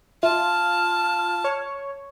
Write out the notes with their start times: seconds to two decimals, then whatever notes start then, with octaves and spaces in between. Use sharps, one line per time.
0.23 F4 E5 A5 F6
1.44 C#5